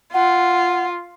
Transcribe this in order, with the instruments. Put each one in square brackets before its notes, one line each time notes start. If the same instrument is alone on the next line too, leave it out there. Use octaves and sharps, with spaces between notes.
[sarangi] F4 [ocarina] F#5